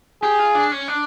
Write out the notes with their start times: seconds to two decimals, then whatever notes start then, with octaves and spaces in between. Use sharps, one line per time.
0.23 G4 G#4
0.39 F4
0.55 D4
0.72 C#4
0.88 D4